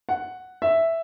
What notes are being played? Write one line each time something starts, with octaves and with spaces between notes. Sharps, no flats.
F#5
E5